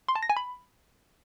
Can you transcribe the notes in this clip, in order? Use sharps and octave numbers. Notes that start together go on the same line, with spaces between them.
C6
A5
A#6
G#5
B5